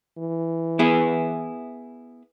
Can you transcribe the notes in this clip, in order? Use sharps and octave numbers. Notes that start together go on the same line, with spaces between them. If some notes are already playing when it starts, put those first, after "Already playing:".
E3
B3 E4 G#4